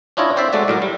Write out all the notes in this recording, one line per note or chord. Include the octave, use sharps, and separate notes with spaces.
C#4 D4 E4 F4 C#5 D#5
C4 C5 D5 E5
G#3 A3 F#4 D5 E5
A2 F#3 A#4
G3